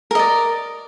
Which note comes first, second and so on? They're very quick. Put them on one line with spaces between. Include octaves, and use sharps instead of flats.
A#4 D#5 D5